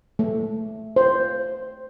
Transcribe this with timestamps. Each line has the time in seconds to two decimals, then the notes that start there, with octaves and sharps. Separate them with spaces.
0.19 A3
0.96 C5